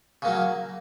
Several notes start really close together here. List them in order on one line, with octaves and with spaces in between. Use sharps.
C#3 A#3 F#3